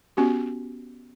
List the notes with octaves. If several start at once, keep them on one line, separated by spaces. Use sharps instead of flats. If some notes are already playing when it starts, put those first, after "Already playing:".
B3 C#4 F#4 G4